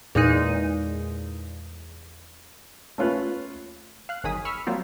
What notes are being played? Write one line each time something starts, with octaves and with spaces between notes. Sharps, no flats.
E2 A#2 G#3 D#4 D#7
A3 C#4 F4 B4
F5 F#6
G1 D#3 F#3 G#4 D#6 B6
B5 C#6 E6 F6 B6
F#3 G3 A#3 C4 F4 F#4